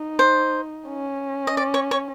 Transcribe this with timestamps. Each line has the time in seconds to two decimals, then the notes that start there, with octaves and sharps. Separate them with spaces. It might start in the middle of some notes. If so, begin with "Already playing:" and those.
Already playing: D#4
0.19 C5
0.89 C#4
1.47 D#5
1.57 D5
1.74 C#5
1.91 C#5